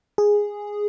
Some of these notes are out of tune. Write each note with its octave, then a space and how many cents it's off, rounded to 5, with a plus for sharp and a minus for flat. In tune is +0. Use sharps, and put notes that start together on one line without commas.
G#4 -5